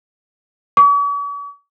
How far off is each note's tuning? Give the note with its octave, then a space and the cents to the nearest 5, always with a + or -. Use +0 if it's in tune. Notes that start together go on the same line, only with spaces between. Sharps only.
C#6 +45